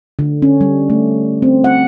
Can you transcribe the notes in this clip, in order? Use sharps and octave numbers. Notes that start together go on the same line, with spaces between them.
D3
C#4
G3
A3
C4
F#5